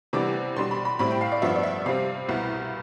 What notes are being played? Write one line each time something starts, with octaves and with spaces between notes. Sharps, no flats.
C3 E3 G3 B3 D4 D6
B2 G3 D4 C6
B5
B5
A2 G3 C4 E4 B5
G5
F5
D5
G2 F3 B3 D4 E5
D5
E5
C3 G3 C4 F5
C2 B2 B3 E4